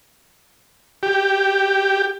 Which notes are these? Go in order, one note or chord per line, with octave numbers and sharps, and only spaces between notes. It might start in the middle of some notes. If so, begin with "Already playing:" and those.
G4